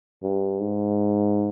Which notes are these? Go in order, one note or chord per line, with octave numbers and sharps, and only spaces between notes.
G2
G#2